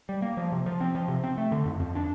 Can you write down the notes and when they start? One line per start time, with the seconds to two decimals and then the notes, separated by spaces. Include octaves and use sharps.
0.09 G3
0.22 A#3
0.37 F3
0.52 C3
0.66 F3
0.81 C4
0.95 F3
1.08 C3
1.24 C4
1.38 A3
1.52 D3
1.66 F2
1.80 F2
1.95 D4